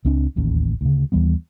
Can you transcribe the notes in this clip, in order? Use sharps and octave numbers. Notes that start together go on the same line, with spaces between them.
C#2 C4 D4
D1 A1 D#2 C#4
D2 C#3
D#2 E3 G3 B3